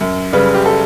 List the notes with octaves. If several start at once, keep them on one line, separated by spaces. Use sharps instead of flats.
F#2
C#3 G3 B4
G4
A4